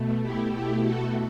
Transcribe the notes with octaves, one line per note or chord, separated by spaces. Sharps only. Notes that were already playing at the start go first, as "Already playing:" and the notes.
Already playing: B2 A3
E4 G4
E4 G4
F#4 A4